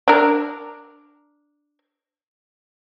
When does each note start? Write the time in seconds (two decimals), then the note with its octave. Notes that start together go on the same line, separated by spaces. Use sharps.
0.08 D4 A#4